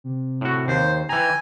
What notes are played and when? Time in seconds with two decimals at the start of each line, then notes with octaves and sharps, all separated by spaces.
0.04 C3
0.41 A2 F#4
0.68 D#2 C5
1.09 E3 G5 G#5 A#5